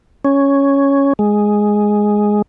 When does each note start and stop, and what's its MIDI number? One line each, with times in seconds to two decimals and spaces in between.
0.25 1.13 61
1.19 2.42 56